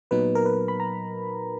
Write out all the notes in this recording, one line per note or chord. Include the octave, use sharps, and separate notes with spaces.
A#2 F#3 B3 D#4 B4
A#4
B4
B5
A#5